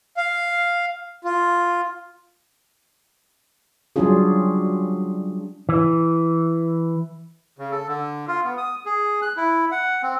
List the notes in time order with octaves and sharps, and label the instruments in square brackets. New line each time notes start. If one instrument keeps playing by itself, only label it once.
[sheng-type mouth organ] F5
F4
[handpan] F#3 G3 C#4 D4 F4 G#4
[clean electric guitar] E3
[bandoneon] C#3
A4
D3
F4
B3
D#6
G#4
F#6
E4
F#5
C4